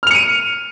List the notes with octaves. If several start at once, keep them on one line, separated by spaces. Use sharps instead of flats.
F6 C#7 D#7 F7